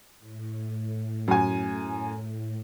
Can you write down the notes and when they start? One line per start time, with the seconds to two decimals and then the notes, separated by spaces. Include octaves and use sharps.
0.19 A2
1.28 F#2 G#5